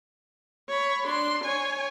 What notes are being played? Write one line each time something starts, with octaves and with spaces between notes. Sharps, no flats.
C#5 B5
D4 C6
C#5 G#5